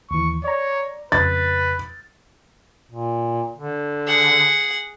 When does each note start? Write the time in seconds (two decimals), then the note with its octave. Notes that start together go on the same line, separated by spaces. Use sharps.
0.11 D#2 E3 C#6
0.44 C#5 D5 A#5
1.12 F2 C#3 B4 A6
2.91 A#2
3.56 D3
4.07 G#4 F#5